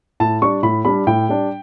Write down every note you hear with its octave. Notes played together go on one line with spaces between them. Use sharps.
A2 A5
G3 D4 C#6
A2 B5
G3 D4 B5
A2 G5
G3 D4